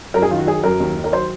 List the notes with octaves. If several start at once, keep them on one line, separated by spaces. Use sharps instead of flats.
F#2 A#4
G#4
D#3 F4
F#4
F#3 G#4
F#2 A#4
D#2
D#3
A#4
F#3 C5